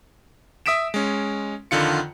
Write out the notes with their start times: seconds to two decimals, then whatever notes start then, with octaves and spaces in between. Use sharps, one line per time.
0.66 E5 D#6 B6 D7 E7
0.94 G#3 C#4
1.71 F2 D3 D#3 F4 C#7